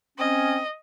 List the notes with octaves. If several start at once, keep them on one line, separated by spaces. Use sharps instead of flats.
C4 C#4 D#5